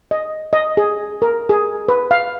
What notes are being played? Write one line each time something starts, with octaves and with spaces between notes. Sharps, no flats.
D#5
D#5
G#4
A#4
G#4
B4
F5